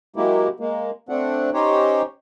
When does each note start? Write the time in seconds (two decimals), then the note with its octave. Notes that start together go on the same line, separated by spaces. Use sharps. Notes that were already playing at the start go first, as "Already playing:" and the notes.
0.16 F#3 G#3 A#3 E4 G4
0.60 G#3 A#3
1.09 A3 C4 D4 F#5
1.54 C#4 D#4 G4 C5 C#5